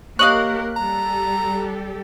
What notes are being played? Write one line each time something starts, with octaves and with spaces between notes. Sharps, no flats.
A#3 G4 A#4 C#5 D#5 F5 F#6
G3 G4 A4 A#5